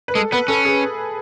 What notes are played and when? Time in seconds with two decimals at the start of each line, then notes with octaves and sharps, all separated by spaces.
0.08 B4
0.15 G#3 A4
0.32 B3 B4
0.48 C#4 A4
0.65 G#4